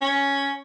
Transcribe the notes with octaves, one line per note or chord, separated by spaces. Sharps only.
C#4